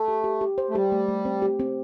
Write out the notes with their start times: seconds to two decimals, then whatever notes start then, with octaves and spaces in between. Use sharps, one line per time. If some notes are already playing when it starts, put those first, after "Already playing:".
Already playing: A3
0.08 G4
0.24 G4
0.41 G4
0.58 C5
0.70 A3
0.75 G3 G4
0.92 A3
1.08 A3
1.25 C4
1.42 G4
1.60 C4